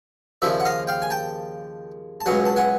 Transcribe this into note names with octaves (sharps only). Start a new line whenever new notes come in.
D#2 C#3 F3 D5 E5
F#5
D#5 F5
F5 G5
G#5
G5 A5
A5
C#2 B2 F#3 F#5 G#5
A5
F#5 G#5